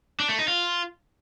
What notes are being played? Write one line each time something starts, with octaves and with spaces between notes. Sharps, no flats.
D4
A3
D#4
F4